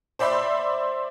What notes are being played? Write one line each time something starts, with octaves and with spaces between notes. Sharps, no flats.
C5 D5 E5 B5 C6 D6